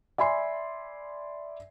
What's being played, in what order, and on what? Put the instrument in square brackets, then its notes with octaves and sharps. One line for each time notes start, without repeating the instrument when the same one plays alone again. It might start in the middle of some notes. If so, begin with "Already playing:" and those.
[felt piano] D5 E5 G#5 B5 C6 C7